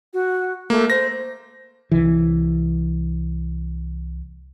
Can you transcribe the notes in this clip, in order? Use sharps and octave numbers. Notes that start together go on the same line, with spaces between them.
F#4
A3 A#3
C5 A#6
C2 E3